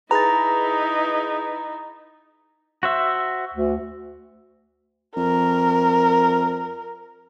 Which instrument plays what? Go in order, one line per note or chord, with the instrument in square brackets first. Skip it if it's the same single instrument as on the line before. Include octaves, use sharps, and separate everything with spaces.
[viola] D#4 E4 [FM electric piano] G#4 B4 [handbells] A#5 A6
[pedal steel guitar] F#4 C5 E5
[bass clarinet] D2
[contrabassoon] F2 [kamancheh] A#4